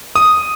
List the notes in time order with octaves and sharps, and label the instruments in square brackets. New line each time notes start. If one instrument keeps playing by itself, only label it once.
[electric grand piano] D#6